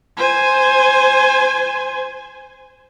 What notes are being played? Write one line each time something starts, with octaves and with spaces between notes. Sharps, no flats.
C5 G#5